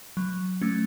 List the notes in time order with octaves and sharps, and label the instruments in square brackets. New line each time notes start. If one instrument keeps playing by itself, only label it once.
[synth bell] F#3
A3 C#4